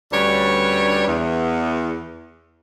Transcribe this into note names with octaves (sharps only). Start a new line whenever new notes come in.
D2 G3 C#4 D4 B4 C#5
E2